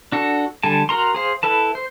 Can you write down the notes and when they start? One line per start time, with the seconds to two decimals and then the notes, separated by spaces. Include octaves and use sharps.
0.12 D4 F#4 A4
0.63 D3 G3 A4 G#5 A5
0.89 F#4 A#4 A#5 C6
1.15 G#4 C5 F5
1.43 E4 A4 B4 A5
1.75 C5